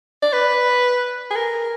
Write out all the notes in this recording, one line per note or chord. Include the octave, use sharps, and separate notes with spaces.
D5
B4
G#4
A#4